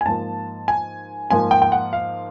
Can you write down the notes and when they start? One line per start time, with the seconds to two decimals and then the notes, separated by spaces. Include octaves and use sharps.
0.01 G#5
0.06 G#2 F3 A#3 A5
0.68 G#5
1.30 G#2 F3 A#3 G#5
1.51 G5
1.62 G5
1.72 F#5
1.93 F5